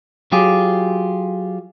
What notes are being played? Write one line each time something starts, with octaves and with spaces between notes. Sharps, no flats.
F#3 F4 G4 G#4